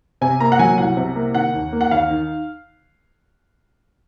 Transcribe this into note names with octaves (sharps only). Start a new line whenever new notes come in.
C3 G#5
A#3 A#5
F#5
F#3 G#5
C2 F#5
C3
A#3
D#3 F#5
D#2
A#3
F#5
D#2 F5
D#3